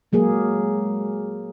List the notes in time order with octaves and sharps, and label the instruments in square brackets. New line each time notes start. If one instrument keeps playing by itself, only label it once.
[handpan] F#3 A#3 G#4 [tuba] G#3